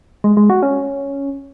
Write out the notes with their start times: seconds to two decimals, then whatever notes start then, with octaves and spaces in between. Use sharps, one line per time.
0.24 G#3
0.37 G#3
0.50 F#4
0.63 C#4